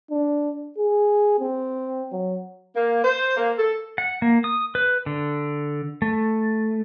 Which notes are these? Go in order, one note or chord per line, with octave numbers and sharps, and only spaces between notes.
D4
G#4
C4
F#3
A#3
C5
A#3
A4
F#5
A#3
D#6
B4
D3
A3